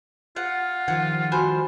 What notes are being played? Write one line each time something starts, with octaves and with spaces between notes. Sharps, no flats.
F4 F#5
D#3 F3 G3 F#5 G#6
F#4 C5 G#5 B5